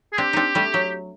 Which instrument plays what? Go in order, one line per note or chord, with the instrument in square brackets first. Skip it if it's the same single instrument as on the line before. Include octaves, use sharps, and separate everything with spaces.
[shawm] G#4
[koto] C4 D4 [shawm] G4
[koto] C4 D4 D#4
G3 A3
F#3